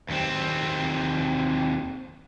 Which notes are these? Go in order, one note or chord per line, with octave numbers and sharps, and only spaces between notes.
D#2 C4